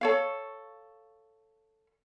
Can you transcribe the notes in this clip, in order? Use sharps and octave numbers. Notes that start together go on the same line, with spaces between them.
A4 C#5 F5